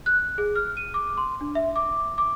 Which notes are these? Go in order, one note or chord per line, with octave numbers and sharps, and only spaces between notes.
F#6
G#4
F6
D#7
D6
C6
D4
E5
D6
D6